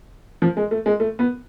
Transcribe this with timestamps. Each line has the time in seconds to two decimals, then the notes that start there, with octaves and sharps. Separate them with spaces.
0.42 F3
0.57 G#3
0.71 A3
0.86 G#3
1.00 A3
1.19 B3